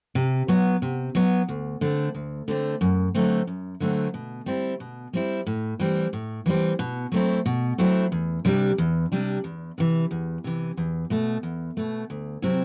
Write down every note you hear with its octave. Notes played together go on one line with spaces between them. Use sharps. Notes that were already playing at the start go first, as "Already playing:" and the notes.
C3
F#3 B3
C3
F#3 B3
D2
D3 A3 C4
D2
D3 A3 C4
F#2
D3 F#3 A3 C4
F#2
D3 F#3 A3 C4
B2
G3 C4 E4
B2
G3 C4 E4
A2
E3 G3 C4
A2
E3 G3 C4
B2
F#3 A3 C4 E4
B2
F#3 A3 C4 E4
E2
C3 G3 D4
E2
C3 G3 D4
E2
C3 E3
E2
C3 E3
E2
B2 A3
E2
B2 A3
D2
C3 F#3 C4 E4